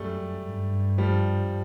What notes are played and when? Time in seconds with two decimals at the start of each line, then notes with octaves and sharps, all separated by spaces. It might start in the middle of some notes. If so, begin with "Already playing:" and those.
Already playing: F#2 G3 A3
0.45 G2
0.98 F3 G3